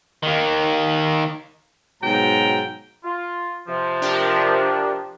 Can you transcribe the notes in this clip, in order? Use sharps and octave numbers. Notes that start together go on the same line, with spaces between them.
D#3 A#3
G#2 B2 F#3 G5 A#5
F4
C3 F3
D4 G4 A#4